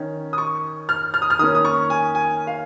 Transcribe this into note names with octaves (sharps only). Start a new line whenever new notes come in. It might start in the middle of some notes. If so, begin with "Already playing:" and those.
Already playing: D#3 C#4
D#6
C#6
F6
F6
D#6
F6
D#3 A#3 C#4 D#6
D#6
C#6
G#5
G#5
F5